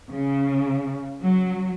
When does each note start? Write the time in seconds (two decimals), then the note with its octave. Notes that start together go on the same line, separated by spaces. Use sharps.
0.10 C#3
1.22 F#3